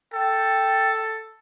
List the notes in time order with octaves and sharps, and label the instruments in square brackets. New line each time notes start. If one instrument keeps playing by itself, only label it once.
[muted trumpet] A4 [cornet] G5